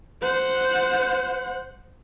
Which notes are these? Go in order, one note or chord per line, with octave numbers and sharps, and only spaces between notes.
C5 F#5